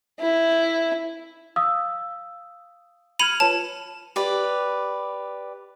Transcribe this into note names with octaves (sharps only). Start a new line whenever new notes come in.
E4
F5 D#6 E6
B5 F6 G#6 C#7 D#7 F7
F4 B4 C#5 A5
G4 B4 D5